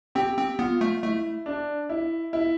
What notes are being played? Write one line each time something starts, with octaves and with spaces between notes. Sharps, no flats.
C4 G4
C4
B3 F4
A3
A3 E4
D4
E4
E4